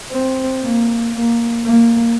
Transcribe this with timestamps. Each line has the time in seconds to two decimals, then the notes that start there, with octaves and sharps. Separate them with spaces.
0.11 C4
0.63 A#3
1.14 A#3
1.65 A#3